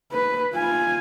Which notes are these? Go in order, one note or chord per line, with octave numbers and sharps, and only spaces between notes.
B4
F4 G#5